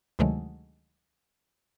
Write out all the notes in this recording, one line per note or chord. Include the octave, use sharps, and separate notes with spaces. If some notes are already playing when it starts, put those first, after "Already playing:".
D2 C3 D#3 F#3 G#3 A3